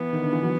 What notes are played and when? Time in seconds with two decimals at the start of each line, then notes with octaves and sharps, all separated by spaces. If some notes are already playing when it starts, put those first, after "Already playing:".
Already playing: E3 B3
0.13 D#3
0.22 D3
0.33 E3
0.43 F#3